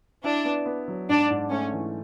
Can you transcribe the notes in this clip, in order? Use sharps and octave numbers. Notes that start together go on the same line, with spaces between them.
D4 E4
B3
B3
F#3
G#2 D4
G#2
A3 C#4
E3